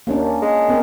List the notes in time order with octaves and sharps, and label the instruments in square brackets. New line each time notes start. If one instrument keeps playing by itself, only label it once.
[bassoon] D#2 [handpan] A#3 C#4 D4
[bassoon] G#3
[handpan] B3 C4 A#4